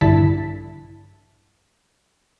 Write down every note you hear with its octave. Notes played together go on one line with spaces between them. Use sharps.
A#1 G2 D3 E4 A5 B6